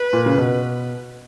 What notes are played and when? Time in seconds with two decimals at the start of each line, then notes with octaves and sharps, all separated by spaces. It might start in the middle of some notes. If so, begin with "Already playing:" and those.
Already playing: B4
0.13 A#2
0.26 C#3
0.38 B2